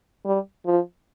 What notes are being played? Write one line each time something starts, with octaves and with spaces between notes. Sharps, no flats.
G3
F3